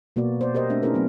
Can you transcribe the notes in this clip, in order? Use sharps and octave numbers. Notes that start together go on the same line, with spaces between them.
B2 A#3 B3 F#4 D5
C5 D5
G4 A#4 C5 D#5
A3 C4 D4 E5
C#4 D#4 F#4 G#4 A#4 B4
F#3 A3 B3 C4